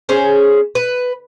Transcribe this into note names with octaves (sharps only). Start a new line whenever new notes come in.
C#4 G#4 C5
B4